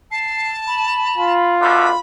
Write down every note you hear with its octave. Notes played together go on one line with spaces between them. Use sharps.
A5 C7
B5
F4
F#2 B2 D3 B5